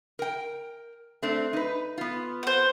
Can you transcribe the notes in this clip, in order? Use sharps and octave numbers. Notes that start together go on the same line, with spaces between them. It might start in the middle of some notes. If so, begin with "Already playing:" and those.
A#4 G5
A3 C4 D4
D#4 B4
B3 F4
C5 F#5